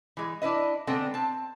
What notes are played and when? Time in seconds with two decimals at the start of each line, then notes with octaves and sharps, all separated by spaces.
0.17 E3 G#3
0.42 D4 E4 B4 D#5
0.87 D3 G#3 B3 C4 A4 G5
1.14 C4 A5